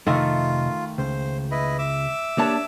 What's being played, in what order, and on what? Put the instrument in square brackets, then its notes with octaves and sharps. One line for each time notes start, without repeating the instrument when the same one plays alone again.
[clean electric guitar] F2 C3 D#5 [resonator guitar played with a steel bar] D#3 A3 [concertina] F4
[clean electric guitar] C#2 [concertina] C5
[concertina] E4 B4 D#5
E5 D6 E6
[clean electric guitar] A#3 D4 [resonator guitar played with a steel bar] G4 C#5 A5